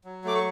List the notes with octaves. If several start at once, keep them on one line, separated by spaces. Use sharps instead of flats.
F#3
A3 D6
C#6